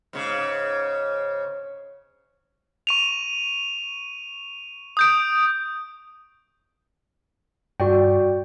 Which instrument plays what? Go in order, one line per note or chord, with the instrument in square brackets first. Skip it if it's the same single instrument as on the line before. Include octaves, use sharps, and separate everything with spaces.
[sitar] G#2 C#3
[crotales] C#6 D#7 F7
D#6 G6 D7
[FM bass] G2 [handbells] F#4 D5 G5